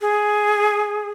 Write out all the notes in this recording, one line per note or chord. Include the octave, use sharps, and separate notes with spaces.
G#4